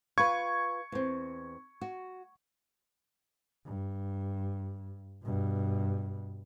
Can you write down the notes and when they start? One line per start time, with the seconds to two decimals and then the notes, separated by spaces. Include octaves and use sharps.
0.18 F4 B4 C#6 G#6
0.92 E2 C4
1.81 F#4
3.66 G2
5.22 G2 B2